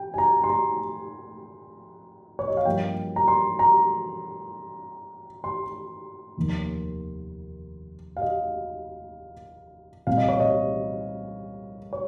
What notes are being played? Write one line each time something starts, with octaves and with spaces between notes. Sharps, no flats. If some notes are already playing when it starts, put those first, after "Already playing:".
Already playing: G5
G#5
A#5
C6
A#5
C#5
D#5
F5
G2 F3 A#3 G5
A#5
C6
A#5
C6
F1 D#2 D#3 A#3
F5
D#5
C2 A#2 G3 C4 F5
D#5
C#5
D#5
C#5